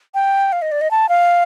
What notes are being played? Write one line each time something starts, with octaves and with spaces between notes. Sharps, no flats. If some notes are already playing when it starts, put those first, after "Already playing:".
G5
F5
D#5
D5
D#5
A5
F5